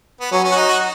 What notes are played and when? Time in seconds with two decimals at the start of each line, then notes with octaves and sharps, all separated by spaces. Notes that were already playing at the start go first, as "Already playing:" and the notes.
0.21 B3
0.32 F#3 C#4
0.44 C#4
0.52 F#4
0.56 D#4
0.68 F#4